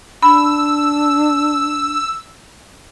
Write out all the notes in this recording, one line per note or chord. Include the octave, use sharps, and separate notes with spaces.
D4 B5 E6